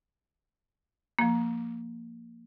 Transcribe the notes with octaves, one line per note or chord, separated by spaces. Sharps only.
F3 A#3